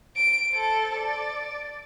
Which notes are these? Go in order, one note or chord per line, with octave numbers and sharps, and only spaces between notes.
D7
A4 C5
D5